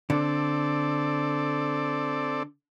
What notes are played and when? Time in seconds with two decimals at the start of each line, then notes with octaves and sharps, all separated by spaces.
0.10 D3 C4 A4 D5